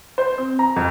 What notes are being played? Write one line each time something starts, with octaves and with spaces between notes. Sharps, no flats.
C5
C4
A#5
F2